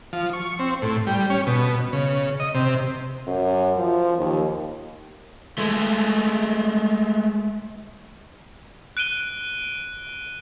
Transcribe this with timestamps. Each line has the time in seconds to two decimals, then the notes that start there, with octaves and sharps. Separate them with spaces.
0.13 F3
0.33 C#6
0.59 C4
0.82 A2
1.07 G3
1.30 C#4
1.47 B2
1.93 C#3
2.40 D#5
2.55 C3
3.27 F#2
3.76 F3
4.18 D#2
5.58 G#3 A3
8.97 F#6 D7 D#7 G7